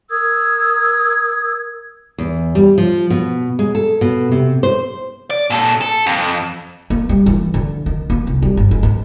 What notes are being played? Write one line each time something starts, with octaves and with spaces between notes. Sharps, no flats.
A#4 D#6 E6 G#6
E2
G3
F3
B2
G#3
A4
B2
C3
C5
D5
A#2 A4
A4
F2
A#3
G3
E3
D3
D#3
A#3
C2
G3
G1
G#3
G#2